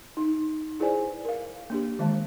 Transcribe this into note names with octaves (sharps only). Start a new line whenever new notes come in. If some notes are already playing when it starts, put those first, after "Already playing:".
D#4
E4 G#4 B4 C5 D5 G#5
A#4 F5
A#3 D4 G4
D#3 E3 G#3 A5